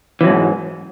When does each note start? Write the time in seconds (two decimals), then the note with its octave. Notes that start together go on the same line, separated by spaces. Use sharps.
0.21 E3
0.24 F#3
0.27 F2
0.30 G#2